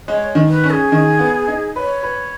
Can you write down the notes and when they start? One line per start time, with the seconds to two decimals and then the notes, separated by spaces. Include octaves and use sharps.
0.08 G#3 C#5
0.35 D#3
0.49 B4
0.64 C#4
0.70 G#4
0.92 D#3
1.19 B3
1.48 D#4
1.76 B4 C#5
2.03 B4